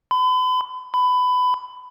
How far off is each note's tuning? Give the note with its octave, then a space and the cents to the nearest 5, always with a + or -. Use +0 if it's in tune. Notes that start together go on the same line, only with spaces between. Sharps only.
B5 +40
B5 +20